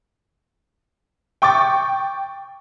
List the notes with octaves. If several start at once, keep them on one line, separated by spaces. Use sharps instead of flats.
G5 C#6 D6 A6